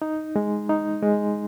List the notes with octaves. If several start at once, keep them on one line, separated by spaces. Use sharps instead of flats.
D#4
G#3
D#4
G#3